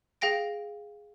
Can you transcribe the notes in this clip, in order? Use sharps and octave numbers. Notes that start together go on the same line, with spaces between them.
G#4 F5 G5 A#6 D7